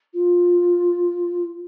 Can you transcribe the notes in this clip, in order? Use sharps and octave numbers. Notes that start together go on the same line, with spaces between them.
F4